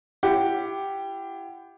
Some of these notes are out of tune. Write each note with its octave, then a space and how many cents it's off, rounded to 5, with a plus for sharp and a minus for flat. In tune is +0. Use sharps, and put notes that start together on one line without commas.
E4 +35 G4 +0 F#5 +0